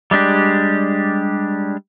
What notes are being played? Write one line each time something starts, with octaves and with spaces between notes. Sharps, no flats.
G3 G#3 D4 G4